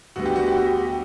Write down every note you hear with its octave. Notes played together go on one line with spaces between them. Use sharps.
D2 D3 G3 B3 F#4
G4
F#4
G4
F#4
G4
F#4
G4